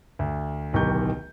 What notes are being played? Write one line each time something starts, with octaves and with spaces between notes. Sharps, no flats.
D2
D1 B1 D#3 G4 C#6 G6